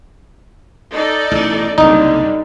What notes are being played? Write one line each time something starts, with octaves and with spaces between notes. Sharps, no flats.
D#4 A4 D5
A1 B2
F#1 C2 D3 G3 A#3 D#4